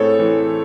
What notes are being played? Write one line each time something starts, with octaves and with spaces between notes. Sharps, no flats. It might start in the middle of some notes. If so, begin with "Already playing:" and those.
Already playing: A2 C4 G#4 A4 C#5
E3